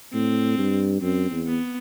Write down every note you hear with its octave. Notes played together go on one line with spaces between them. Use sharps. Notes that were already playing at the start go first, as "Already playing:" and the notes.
A2 C4
G2
F#2 C4
E2
B3